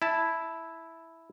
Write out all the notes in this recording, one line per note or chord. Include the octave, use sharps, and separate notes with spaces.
E4 A5